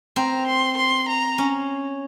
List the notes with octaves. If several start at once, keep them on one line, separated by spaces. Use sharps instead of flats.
C4 A#5
C6
C6
A#5
C#4